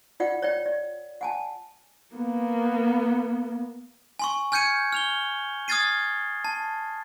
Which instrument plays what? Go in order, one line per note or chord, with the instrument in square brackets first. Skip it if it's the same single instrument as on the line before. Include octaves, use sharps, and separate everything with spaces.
[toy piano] F4 D5 F#5 G5
C#5 D5 G5
D5
F#5 G#5 A5
[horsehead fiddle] A#3 B3
[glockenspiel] G#5 C6 C#6
G#5 F6 G6 G#6 C#7 D#7
F6 F7 G7
D#6 F6 G#6 A6 C7 D#7
A5